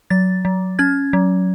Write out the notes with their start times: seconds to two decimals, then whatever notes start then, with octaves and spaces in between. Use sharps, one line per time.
0.10 F#3 A6
0.45 F#3
0.79 C#4 G#6
1.13 F#3